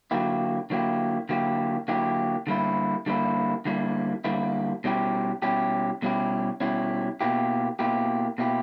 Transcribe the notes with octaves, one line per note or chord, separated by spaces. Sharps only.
D3 F#3 A#3 E4 G4
D3 F#3 A#3 E4 G4
D3 F#3 A#3 E4 G4
D3 F#3 A#3 E4 G4
D3 G3 A#3 E4
D3 G3 A#3 E4
D3 G3 A#3 E4
D3 G3 A#3 E4
B2 G3 C#4 E4 G4
B2 G3 C#4 E4 G4
B2 G3 C#4 E4 G4
B2 G3 C#4 E4 G4
B2 A#3 E4 G4
B2 A#3 E4 G4
B2 A#3 E4 G4